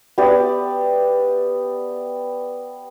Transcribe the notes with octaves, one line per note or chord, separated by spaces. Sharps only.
B3 G4 D5 E5